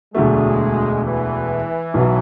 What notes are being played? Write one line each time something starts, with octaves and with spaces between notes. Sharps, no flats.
E1 D2 D3 F#3 G#3 A3
E3
B1 B2 F#3